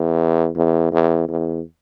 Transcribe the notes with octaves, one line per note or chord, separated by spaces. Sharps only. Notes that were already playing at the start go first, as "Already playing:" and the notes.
Already playing: E2
E2
E2
E2